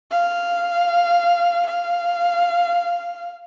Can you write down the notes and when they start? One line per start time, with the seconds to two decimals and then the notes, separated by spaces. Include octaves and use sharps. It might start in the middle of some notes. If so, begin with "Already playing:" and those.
0.11 F5
1.67 F5